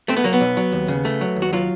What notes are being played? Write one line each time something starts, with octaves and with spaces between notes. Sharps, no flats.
A3 C4
B3
F#3 A#3
B3
B1
F#3
D#2
C#3
A3
F#3
D#2
F#4
F#3 F4